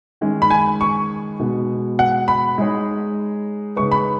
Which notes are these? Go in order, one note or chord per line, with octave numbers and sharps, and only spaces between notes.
D#3 G#3 C#4
B5
G#5
C#6
B2 G#3 B3
F#5
B5
G#3 D#4 G#4 C#5
C#3 G#3 D#4 G#4 B4 C#6
B5